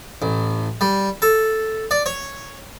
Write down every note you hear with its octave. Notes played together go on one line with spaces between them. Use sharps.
A1
G3
A4
D5
C#5